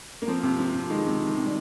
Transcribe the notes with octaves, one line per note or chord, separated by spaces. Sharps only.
A#3
F3 C4
C3
F3
C3
D#3 G#3
C3
D#3
C3
G3